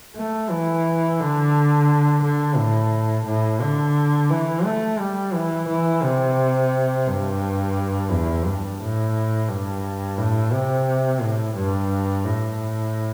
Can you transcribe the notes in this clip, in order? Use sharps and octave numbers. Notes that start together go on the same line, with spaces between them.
A3
E3
D3
D3
A2
A2
D3
E3
A3
G3
E3
E3
C3
G2
E2
G2
A2
G2
A2
C3
A2
G2
A2